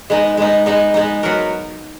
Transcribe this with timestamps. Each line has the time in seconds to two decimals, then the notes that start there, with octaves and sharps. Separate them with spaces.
0.10 G#3 B3 D#4
0.37 G#3 B3 D#4
0.66 G#3 B3 D#4
0.94 G#3 B3 D#4
1.23 F#3 B3 F#4 A#4